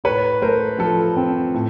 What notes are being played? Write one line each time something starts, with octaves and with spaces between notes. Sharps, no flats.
A2 B4 C#5
A3 A#4 C5
F3 A4
C4
A2